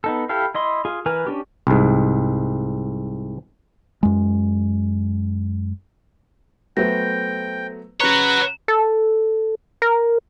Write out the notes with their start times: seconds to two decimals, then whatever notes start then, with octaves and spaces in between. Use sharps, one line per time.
0.04 B3 D#4 A4
0.29 E4 G4 A4 F5
0.55 E4 D#5 C6
0.85 F4 G#4
1.06 E3 A#4 B4 G#5
1.27 C#4 D4 G4
1.67 C2 G#2
4.03 F#2 G#3
6.77 F#3 A3 B3 C5 G5 G6 A#6
8.00 C#3 F#4 B4 C#5 A#5 G7
8.68 A4
9.82 A#4